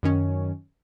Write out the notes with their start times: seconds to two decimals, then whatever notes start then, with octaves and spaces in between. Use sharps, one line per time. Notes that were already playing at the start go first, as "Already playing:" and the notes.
0.03 F#2 D#3 C#4